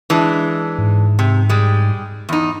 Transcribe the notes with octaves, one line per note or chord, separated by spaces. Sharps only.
E3 G#3 D4
G#2
C3
G3 G#3
E2 D#4